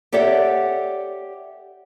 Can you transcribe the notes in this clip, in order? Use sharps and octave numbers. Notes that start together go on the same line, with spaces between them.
G4 A4 C#5 D5 E5 F#5